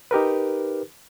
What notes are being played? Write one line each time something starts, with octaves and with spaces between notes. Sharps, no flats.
D#4 G4 A#4 B4